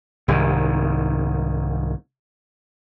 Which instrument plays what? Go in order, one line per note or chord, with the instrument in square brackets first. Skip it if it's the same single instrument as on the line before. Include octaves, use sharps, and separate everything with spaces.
[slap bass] C2 G#2 D#3